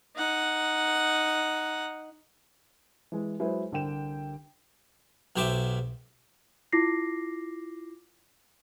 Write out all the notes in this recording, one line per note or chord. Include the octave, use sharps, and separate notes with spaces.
D#4 F#5
E3 G#3
F#3 G#3 E4 G#4 B4 C5
C2 D3 G4 A#4 G5 E7
B1 F#3 G4 C5 E5 D6
E4 F4 D6 A#6 C7